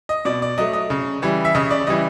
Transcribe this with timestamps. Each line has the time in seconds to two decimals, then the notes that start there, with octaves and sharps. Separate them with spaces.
0.09 D#5
0.25 B2 D5
0.42 D5
0.58 F#3 A3 D#5
0.73 D#5
0.90 C#3
1.22 E3 G3
1.45 E5
1.55 C#3 D#5
1.71 D5
1.87 E3 G3 D#5